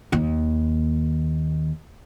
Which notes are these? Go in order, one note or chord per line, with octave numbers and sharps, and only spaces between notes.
D#2 A#3